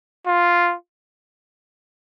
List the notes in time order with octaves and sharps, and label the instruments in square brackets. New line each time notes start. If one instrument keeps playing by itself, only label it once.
[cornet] F4